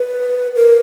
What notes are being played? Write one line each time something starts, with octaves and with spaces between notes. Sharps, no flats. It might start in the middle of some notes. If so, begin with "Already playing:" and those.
Already playing: B4
A#4